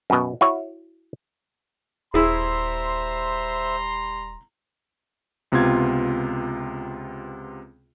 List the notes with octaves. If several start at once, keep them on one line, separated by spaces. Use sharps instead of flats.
F#2 B2
E4 F#4 C#5
D#1 G3 E4 G#4 C5 E5 A#5 C6
C#2 C3 B3 F4 G#6